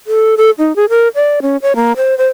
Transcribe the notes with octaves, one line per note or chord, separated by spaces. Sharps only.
A4
A4
D#4
G#4
A#4
D5
C#4
C#5
A#3
C5
C5